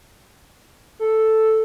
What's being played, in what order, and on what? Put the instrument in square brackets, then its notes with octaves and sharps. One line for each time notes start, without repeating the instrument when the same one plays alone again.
[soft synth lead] A4